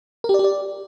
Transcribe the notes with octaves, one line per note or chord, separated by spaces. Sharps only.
A#4
G4
D5
G4
D5